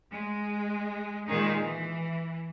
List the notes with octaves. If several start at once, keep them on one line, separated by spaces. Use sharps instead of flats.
G#3
A#2 D#3 G#3 D#4 G#4
E3